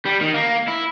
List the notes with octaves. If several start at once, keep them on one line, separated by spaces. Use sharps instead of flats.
G3
D#3
A#3
E4